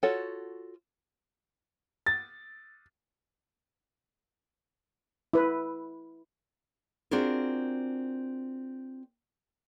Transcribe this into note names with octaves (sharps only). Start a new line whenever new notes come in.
F4 F#4 A4 C#5 F#5
A6
E4 B4
C4 D4 F4 F#4 G#4 A#4